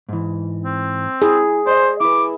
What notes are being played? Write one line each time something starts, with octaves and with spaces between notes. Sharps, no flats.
G#2 E3
C4
E4 G#4
C5 D5 D#5
E4 B4 D6